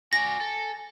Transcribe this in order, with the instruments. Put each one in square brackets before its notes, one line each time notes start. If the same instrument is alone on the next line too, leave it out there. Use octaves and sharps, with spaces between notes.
[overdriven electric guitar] F#4 D5 [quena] G#5 [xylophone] A#6
[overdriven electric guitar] A4